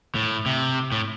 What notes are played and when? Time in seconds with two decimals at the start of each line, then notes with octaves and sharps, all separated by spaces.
0.15 A2
0.46 C3
0.92 A2